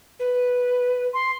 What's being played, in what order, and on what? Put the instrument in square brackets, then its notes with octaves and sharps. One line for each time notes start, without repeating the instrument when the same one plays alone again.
[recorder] B4
[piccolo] C6